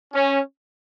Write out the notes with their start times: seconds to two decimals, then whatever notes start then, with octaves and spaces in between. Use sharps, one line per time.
0.14 C#4